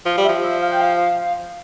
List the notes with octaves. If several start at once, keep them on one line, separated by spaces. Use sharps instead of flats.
F3 F5
G3
F3 E5
E5
F5
G5
F5